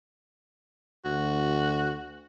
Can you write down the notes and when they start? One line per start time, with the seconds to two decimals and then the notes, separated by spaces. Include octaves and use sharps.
1.05 D2 F#4